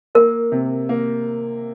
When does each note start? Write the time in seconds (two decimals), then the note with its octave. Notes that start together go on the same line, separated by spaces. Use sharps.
0.15 A#3 A#4
0.52 C3
0.89 A#3